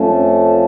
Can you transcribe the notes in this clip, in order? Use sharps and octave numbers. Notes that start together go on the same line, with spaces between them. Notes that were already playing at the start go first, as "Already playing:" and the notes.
Already playing: F2 F3 A3 C#4